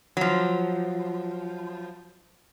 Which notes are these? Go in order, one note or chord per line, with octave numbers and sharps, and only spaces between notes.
F3 F#3